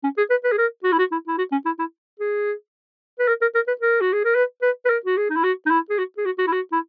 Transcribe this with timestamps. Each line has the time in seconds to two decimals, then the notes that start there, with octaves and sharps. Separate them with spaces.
0.03 C#4
0.17 G#4
0.30 B4
0.44 B4
0.52 G#4
0.58 A#4
0.84 F#4
0.92 E4
0.99 F#4
1.12 E4
1.27 E4
1.38 F#4
1.52 C#4
1.65 E4
1.79 E4
2.20 G#4
3.19 B4
3.28 A#4
3.41 A#4
3.55 A#4
3.67 B4
3.81 A#4
4.01 F#4
4.13 G#4
4.24 A#4
4.35 B4
4.62 B4
4.85 B4
4.89 A#4
5.05 F#4
5.17 G#4
5.30 D#4
5.36 E4
5.44 F#4
5.66 D#4
5.70 E4
5.90 G#4
5.98 F#4
6.17 G#4
6.25 F#4
6.38 F#4
6.47 E4
6.52 F#4
6.72 E4